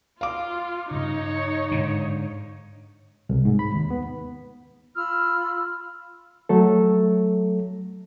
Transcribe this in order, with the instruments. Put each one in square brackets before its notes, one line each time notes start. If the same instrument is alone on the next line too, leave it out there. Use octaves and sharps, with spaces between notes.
[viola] F4 [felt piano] F5 D6
[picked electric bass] G2 C#3 [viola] D#4 C#5
[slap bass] G#2 D3
[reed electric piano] C2
G#2
B5
D#2
B3
[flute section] F4 B5 E6 F6
[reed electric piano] F#3 A3 A4